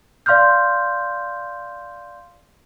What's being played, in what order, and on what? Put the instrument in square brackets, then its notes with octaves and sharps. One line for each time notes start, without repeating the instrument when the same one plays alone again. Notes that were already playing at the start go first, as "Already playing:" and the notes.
[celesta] D5 F5 C6 D6 F6 G6